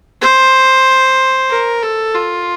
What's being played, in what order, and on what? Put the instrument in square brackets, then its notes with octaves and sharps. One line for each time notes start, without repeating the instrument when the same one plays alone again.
[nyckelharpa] C5
A#4
A4
F4